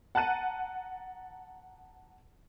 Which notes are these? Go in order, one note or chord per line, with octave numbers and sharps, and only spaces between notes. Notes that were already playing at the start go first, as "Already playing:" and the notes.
F#5 A5 A#5 F#6 D#7